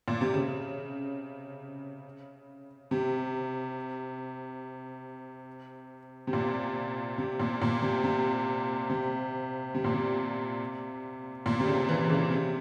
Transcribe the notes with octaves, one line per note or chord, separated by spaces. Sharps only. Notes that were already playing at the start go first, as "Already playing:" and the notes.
A#2
C3
C#3
C3
C3
A#2
C3
A#2
A#2
C3
C3
C3
C3
A#2
C3
A#2
C3
C#3
E3
C#3
C3